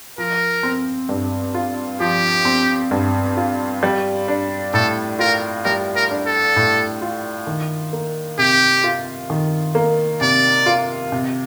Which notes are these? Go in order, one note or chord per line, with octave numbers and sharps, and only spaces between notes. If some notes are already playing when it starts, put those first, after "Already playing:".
F3 A#4
C4
G2
F4
F3 G4
C4
G2
F4
G3
D4
A2 A4
F4 A#4
G3 A#4
A#4
D4
A4
A2
F4
D#3
A#3
C3 G4
F4
D#3
A#3
C3 D5
F4
C3